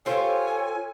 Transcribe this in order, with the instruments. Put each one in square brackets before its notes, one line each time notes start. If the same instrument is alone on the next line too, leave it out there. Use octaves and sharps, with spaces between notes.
[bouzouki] F4 G4 C5 [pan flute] A4 [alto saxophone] C#5 [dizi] G#5